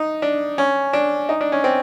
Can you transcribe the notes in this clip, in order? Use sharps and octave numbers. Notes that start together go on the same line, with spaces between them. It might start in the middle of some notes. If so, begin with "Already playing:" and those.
Already playing: D#4
D4
C#4
D4
D#4
D4
C#4
C4